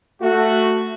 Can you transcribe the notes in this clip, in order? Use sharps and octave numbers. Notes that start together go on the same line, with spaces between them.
A3 F#4